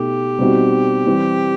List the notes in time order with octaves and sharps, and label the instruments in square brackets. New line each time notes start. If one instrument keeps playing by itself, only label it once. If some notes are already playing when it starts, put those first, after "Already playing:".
Already playing: [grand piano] B2 A3 D#4 [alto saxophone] G4
[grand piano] B2 G3 C4 D#4 F#4
E3 G3 C4